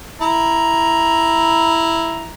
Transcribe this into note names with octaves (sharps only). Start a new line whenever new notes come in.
E4 A#5